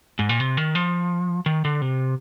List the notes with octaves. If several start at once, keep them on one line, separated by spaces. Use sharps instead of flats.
G#2
A#2
C3
D#3
F3
D#3
D3
C3